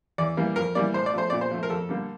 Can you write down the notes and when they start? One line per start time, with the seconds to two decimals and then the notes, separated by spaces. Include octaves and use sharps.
0.18 E2 D5
0.37 E3 G3 A#3
0.56 F2 A#4
0.75 E3 G3 A#3 D5
0.94 A2 C5
1.06 D5
1.13 F3 A3 C5
1.30 A#2 D5
1.41 C5
1.51 F3 A3
1.63 A#4
1.70 F2 A4
1.89 D3 G3 A#3